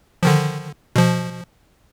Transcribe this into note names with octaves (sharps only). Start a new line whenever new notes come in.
D3 D#3 F3
B2 F3